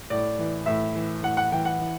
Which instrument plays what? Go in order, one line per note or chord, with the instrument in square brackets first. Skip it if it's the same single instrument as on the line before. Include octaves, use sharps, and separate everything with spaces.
[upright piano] A2 D5
E3
A2 E5
E3
A2 F#5
F#5
E3 G5
F#5
E3